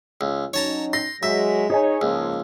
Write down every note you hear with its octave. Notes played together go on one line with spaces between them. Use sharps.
C#2
F#3 C#4 D#4 C#5 A5 A#5
C6 A#6
F#3 G#3 E5 B6
D#4 G#4 C#5 D#5 G#5
C#2 G#2 F3 A#3